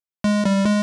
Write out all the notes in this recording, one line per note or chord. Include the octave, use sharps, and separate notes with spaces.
G#3
G3
G#3